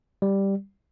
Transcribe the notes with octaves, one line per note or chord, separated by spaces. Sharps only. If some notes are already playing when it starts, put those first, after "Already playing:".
G3